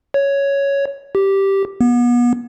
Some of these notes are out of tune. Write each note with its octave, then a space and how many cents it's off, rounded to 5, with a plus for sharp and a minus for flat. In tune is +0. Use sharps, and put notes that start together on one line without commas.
C#5 +5
G4 -5
B3 -35